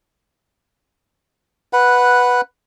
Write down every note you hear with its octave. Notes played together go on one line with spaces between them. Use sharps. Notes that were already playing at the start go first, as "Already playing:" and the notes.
B4 F#5